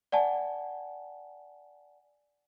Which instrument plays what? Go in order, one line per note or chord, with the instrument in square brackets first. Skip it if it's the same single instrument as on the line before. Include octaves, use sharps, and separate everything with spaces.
[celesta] D5 F#5 G#5 A5